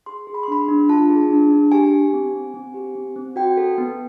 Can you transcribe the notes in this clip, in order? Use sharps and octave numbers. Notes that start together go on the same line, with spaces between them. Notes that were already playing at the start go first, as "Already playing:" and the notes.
G#4 C6
G#4
B5
C6
D4 B5
D4
F4 A5
G#4
D4
D4
G4 G#5
G4
C4
C4
C4
G4
C4
C4
F#4 G5
A4
B3